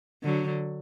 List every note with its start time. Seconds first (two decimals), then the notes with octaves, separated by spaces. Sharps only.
0.23 D3 F#3